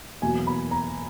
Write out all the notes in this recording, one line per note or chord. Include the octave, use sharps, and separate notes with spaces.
E2 B2 F#3 A#3 G#5
B5
A#5